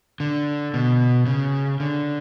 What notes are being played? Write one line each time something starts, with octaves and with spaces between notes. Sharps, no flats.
D3
B2
C#3
D3